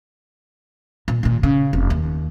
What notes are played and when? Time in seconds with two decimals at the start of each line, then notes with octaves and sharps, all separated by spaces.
1.08 A#2
1.23 D#2 A#2
1.43 C#3
1.73 F1
1.90 D#2